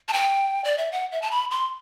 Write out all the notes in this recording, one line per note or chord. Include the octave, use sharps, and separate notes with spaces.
A5
G5
D5
E5
F#5
E5
A5
B5
C6